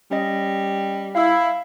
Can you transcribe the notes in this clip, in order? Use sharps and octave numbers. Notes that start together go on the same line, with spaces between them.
G3 C#4 D#5
E4 F5 E6